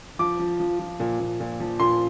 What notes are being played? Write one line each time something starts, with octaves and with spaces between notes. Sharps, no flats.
F3 D6
F3
F3
F3
A#2
A#2
A#2
F3
A#2 C6